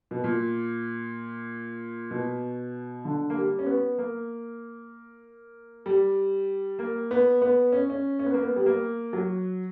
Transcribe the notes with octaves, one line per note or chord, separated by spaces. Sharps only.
B2
A#2
B2
D3
A#3
G3
C#4
B3
A#3
G3
A#3
B3
B3
C#4
C#4
C#4
B3
A#3
B3
G3
A#3
F#3